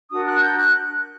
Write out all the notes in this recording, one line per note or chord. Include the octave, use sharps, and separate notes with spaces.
D4 F#4 A#4 D#6
F#6
G6
F#6